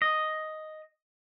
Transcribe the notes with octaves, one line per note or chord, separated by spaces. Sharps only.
D#5